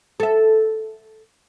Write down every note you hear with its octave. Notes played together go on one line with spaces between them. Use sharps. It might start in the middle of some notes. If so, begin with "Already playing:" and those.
A4 E5